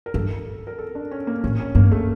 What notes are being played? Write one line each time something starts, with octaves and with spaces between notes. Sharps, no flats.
A#4
G2 A4
A#4
A4
D4
C#4
A#3
A2 C#4
C#4
G2 A#3
A3